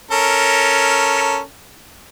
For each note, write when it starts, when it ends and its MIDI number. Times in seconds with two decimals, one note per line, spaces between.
0.11 1.40 61
0.11 1.40 69
0.11 1.40 70